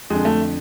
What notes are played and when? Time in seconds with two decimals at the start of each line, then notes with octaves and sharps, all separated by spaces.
0.10 F2 D3 G#3
0.25 A3